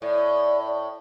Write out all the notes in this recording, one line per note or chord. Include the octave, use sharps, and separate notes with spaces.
A2 D5